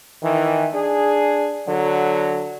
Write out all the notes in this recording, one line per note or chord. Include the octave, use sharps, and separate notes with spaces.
D#3 E3
D4 G#4
D3 F#3